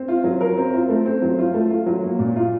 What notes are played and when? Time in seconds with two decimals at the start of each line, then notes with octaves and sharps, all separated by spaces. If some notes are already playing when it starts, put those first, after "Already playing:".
Already playing: C4
0.08 F4
0.24 F#3
0.41 A#4
0.57 C4
0.73 F4
0.88 A3
1.05 C4
1.22 F#3
1.38 F4
1.53 A3
1.70 F4
1.86 F#3
2.03 A#3
2.19 A#2
2.36 F4